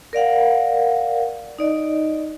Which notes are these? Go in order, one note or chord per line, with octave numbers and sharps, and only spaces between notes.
A#4 D5 F5 F#5
D#4 D5 D#5